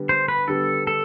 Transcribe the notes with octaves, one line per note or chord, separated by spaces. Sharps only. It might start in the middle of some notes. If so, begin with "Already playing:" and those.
Already playing: D3 G3 B3
C5
B4
D3 G3 B3 A4
A4